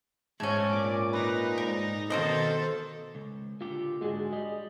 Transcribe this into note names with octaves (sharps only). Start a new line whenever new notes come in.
G#2 A3 C#4 G#6
A#2 D6
D#4 B4
G#2 A#4
B2 D#3 A#3 A4 A#4 C5 D#5
C#2
A#2 D3 F4 G4
G#2 D3 G#3 D4 F#4 G#4
G3 D#5